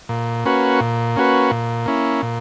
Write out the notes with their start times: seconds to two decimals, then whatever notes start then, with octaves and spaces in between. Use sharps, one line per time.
0.09 A#2
0.45 A#3 C#4 F#4 B4
0.81 A#2
1.16 A#3 C#4 F#4 B4
1.51 A#2
1.86 A#3 C#4 E4
2.22 A#2